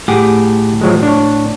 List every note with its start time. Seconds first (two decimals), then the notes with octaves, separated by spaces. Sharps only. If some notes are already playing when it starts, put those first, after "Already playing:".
0.08 A2 G4 G#4 F#5
0.81 F3 F#3 G#3
1.03 D4 C#5